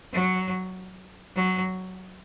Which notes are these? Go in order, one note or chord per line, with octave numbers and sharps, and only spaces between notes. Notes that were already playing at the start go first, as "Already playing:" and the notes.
F#3
F#3